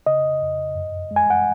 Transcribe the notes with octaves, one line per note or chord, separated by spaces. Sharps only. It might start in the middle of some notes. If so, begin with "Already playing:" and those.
C#3 D#5
F2
F#2
G#3
G#5
F#5